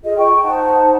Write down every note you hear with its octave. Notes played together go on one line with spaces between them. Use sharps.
F4 G#4 A4 D#5
G5 C#6
D#4 C5 F#5 A5